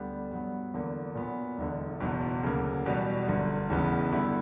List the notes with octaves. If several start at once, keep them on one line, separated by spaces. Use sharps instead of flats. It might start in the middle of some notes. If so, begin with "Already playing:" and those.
Already playing: D2 D3 G3 B3 D4
G2 F#3 B3
E2 D3 A#3
A#2 F#3 B3
E1 E2 D3
F#1 E2 B2
D2 C#3 F#3 A#3
E2 B2 G3 B3 F#4
G1 F#2 D3
E1 E2 C#3 E3 B3
G2 D3 G3 B3 E4